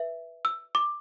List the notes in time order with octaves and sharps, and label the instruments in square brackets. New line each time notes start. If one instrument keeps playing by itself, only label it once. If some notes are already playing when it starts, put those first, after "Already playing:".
Already playing: [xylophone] B4 E5
E6
D6